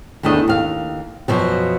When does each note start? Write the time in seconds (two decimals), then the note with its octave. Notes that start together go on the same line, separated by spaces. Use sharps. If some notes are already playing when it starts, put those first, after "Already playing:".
0.23 E2 D#3 A3 D4 D#5
0.48 D#2 F5
1.28 F#2 B2 F3 F#3